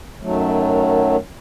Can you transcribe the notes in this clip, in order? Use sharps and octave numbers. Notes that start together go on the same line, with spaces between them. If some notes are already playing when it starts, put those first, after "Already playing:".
F#2 D#3 F#3 A3